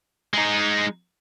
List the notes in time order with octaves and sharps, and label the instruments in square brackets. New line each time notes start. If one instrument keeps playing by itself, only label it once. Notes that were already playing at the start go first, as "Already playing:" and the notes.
[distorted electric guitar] G#3 D#4